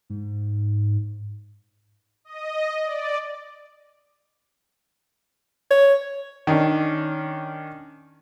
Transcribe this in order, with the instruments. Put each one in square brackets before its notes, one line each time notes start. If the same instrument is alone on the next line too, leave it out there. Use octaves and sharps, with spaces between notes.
[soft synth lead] G#2
[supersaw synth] D#5
D5
[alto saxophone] C#5
[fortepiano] D#3 C#4 D4